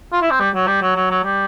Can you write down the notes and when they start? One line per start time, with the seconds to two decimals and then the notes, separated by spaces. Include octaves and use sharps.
0.12 F4
0.21 E4
0.30 C4
0.40 G3
0.54 F#3
0.67 G3
0.82 F#3
0.96 F#3
1.10 F#3
1.24 G3